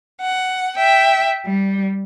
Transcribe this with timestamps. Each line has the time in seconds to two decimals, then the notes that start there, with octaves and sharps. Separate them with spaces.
0.20 F#5
0.77 E5 G5
1.44 G3